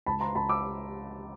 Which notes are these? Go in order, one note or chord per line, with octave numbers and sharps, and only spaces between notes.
C#2 A5 B5
A#5 C6
C#2 A5 B5
D6 E6